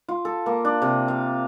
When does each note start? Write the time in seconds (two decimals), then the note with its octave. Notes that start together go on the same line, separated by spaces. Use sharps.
0.08 F4
0.25 A4
0.46 A#3
0.65 D4
0.82 C3
1.08 F5